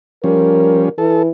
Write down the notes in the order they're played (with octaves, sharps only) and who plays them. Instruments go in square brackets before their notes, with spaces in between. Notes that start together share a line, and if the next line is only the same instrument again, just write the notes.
[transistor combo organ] F3 G3 C#4 [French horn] A#4
[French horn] E3 [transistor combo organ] A4